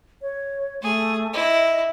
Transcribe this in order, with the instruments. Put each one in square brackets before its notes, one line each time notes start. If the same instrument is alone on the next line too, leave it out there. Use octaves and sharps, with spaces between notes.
[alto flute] C#5
[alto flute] A3 [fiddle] G#4
[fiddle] E4 [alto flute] D#5